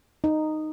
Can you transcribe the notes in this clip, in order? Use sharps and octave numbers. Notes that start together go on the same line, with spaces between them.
D#4